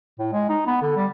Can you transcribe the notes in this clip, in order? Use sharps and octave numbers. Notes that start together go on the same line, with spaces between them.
A2
G#3
D#4
B3
D3
G3